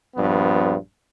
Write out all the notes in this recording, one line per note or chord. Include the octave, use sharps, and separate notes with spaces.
A#1 G2 F3 B3